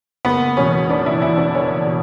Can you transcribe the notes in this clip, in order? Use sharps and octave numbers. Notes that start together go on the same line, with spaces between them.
F#1 B3
E2 B2 C#4
F#1 D4
E4
E2 B2 E4
D4
F#1 C#4
B2